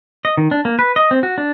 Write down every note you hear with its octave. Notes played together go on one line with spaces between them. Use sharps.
D#5
D#3
D4
A#3
B4
D#5
C4
F#4
D4